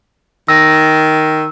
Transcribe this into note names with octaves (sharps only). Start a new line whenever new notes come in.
D#3 E6 A#6